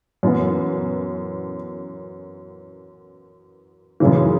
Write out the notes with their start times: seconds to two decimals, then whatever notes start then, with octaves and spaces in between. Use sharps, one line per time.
0.23 F#2 E3 B3
4.00 F#2 C#3 E3